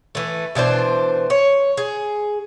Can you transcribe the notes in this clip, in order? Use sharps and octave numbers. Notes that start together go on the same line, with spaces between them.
E3 A3
B2 E3 D4 C5
C#5
G#4